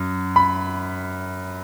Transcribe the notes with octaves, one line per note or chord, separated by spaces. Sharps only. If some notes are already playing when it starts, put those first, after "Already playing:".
Already playing: F#2
B5